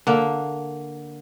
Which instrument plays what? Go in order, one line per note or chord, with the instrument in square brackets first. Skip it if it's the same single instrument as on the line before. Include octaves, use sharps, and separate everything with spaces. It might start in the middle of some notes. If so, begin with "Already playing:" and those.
[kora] D3 A#3